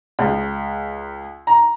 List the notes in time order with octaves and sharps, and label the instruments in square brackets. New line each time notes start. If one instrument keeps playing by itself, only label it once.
[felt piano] C#2
A#5